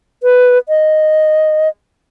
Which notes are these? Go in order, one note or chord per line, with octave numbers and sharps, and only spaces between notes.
B4
D#5